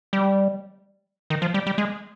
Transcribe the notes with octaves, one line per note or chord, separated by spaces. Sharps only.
G3
D#3
F3
G3
G3
G#3